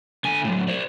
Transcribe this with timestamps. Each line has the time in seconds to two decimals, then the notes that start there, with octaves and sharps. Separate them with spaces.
0.24 D3 G#5
0.44 A2 F#3
0.68 C5 D5